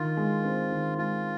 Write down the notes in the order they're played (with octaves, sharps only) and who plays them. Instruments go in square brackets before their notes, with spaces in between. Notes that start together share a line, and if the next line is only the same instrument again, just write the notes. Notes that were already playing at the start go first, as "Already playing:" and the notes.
Already playing: [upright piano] D#3 [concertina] F4
[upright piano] G#3
C4
D#3
[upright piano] G#3 [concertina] F4